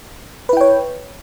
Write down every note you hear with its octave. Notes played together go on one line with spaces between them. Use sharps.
E4 B4 C#5 G5